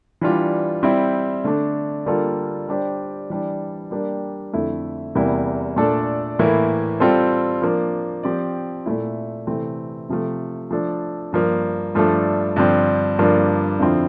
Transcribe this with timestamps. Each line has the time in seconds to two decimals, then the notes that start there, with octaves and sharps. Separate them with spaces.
0.21 E3 G3 D4 F4
0.83 G3 C4 E4
1.44 D3 A3 D4
2.06 D3 G3 A#3 F4 A4
2.68 G3 D4 G4 C5
3.30 E3 G3 D4
3.91 G3 A#3 D4 G4
4.53 F2 D3 A3 E4
5.15 E2 C3 G3 A#3 E4
5.76 A#2 A3 D4 A4 D5
6.39 A2 E3 A#3 E4
7.00 G3 C4 F4 A4 C5
7.62 F3 A#3 D4
8.23 F3 C4 G4 D5
8.86 A#2 A3 E4
9.47 C3 E3 A3 C4
10.09 C3 F3 A3
10.71 F3 A3 D4 A4
11.32 G2 F3 A#3
11.95 G2 F3 A3 D4 A4
12.56 G2 D3 F3 C4
13.19 G2 D3 F3 A#3 D4
13.79 F2 D3 F3 C4 E4